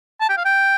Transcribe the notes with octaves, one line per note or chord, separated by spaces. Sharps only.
A5
G5
F5
G5